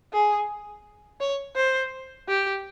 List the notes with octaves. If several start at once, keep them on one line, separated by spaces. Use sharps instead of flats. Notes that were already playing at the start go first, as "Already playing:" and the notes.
G#4
C#5
C5
G4